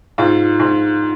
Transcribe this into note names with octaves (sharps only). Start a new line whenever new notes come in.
G#2 F4
G#2